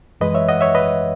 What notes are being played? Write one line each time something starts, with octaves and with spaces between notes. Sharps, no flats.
F#2 E3 G#3 B4 D#5
C#5 E5
D#5 F#5
C#5 E5
B4 D#5